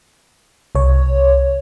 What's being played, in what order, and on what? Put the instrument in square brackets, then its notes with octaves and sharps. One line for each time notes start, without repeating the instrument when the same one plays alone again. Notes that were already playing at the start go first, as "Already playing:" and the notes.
[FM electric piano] C2 C#5